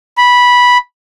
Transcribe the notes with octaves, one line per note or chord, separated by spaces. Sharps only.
B5